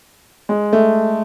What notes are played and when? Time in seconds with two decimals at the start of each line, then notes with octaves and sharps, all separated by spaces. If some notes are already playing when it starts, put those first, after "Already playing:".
0.49 G#3
0.73 A3